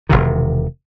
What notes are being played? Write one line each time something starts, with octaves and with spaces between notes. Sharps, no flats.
E1 C2 C3 D#3